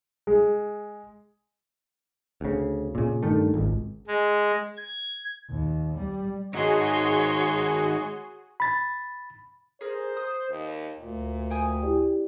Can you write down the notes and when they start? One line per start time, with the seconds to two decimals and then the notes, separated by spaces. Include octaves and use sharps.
0.27 G#3
2.41 D2 C#3
2.95 A#2 C#3
3.23 G2 D#3 A3
3.54 G#1 C#2
4.08 G#3
4.77 G#6
5.50 D#2
5.98 G3
6.54 D#3 G#3 D#4 F#4 G#4 C#5 C6
8.60 B5 A6
9.81 G#4 A#4 C5
10.17 D#6
10.50 D#2
10.99 D2 A#2
11.51 G5 G#5 D#6
11.82 E4 G4 D5